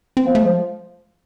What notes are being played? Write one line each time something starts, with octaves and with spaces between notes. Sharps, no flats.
C4
F3 B3
A3
F3 G#3